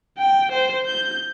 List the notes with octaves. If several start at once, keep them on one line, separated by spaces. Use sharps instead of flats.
G5
C5
G6